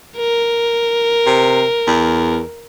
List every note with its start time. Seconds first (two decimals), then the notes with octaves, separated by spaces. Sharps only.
0.18 A#4
1.26 C3
1.87 E2